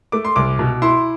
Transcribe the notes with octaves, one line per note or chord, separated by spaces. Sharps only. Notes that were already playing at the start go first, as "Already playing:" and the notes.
A3 D6
C6
C2 D6
B2
E4 C6